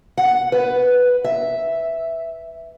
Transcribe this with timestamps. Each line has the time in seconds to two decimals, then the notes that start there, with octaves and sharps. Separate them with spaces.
0.17 F#5
0.52 B4
1.24 E5